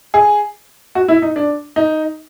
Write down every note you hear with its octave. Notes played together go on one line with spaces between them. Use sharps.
G#4
F#4
E4
D#4
D4
D#4